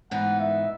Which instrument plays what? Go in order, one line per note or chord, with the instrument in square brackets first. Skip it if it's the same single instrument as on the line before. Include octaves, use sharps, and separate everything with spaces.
[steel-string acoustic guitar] G#2 E3 B3 D#4 [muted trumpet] F#5
[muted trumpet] E5